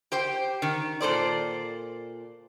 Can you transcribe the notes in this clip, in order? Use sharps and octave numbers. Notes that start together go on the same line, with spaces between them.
G4 C5 G5
D#3
A#2 A4 C5 D5